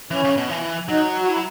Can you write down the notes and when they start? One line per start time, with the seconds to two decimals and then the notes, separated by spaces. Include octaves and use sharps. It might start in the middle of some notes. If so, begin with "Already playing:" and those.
0.11 E3 C#4
0.24 C#3
0.37 B2
0.50 E3
0.89 F#3 D#4
1.21 F#4
1.28 E4